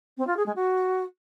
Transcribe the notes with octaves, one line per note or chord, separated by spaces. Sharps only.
C4
F4
G#4
G#3
F#4